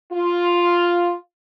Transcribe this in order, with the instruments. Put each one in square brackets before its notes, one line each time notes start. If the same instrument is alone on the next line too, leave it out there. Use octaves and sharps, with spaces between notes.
[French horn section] F4